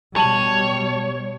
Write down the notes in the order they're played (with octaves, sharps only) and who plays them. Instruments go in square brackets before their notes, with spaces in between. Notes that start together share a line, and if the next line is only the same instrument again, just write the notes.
[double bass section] B2 G3 [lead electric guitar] C#5 [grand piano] A5 D#7 F#7